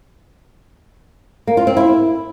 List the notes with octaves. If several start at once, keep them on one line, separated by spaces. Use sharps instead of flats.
A#3
F4
C4
E4